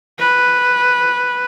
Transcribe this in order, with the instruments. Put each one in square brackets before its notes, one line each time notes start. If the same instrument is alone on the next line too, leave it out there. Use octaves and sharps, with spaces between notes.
[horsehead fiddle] B4